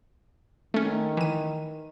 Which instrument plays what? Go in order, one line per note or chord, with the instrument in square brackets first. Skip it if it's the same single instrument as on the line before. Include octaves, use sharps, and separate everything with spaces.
[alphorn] D#3 [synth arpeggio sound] A3 C#4
[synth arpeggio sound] E3 D#7